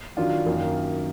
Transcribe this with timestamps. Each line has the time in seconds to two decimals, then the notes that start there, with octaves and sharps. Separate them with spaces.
0.17 D#3 F#3 D4 F4
0.46 F#2 D#3 A#3